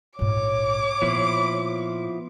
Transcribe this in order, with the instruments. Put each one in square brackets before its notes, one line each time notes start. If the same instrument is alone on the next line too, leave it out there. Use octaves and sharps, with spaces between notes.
[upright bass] A#1 G#2 [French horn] C#5 [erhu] D6
[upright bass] A#2 [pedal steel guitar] F3 B3 E4